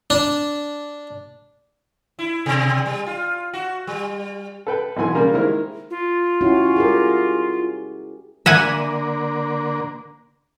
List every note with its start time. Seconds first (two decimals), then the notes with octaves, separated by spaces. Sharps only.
0.10 D4
2.19 E4
2.46 B2
2.86 G3
3.06 F4
3.54 F#4
3.87 G3
4.67 A4 B4 G5
4.97 B1 B2 E3 G#5 C6
5.15 C#3 G3 A#3 A#4
5.34 D#3 G#3 E4 A#4 C5
5.90 F4
6.41 C#4 E4 F#4
6.76 G4 G#4 A#4
8.46 D3 A#3 E5 F#5 G#5